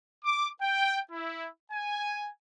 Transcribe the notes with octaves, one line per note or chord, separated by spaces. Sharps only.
D6
G5
E4
G#5